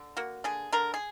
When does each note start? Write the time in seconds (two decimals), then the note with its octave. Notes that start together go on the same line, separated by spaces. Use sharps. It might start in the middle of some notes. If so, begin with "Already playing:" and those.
Already playing: D3
0.17 A#3 F#4
0.44 D3 G#4
0.72 D3 A#4
0.94 G#4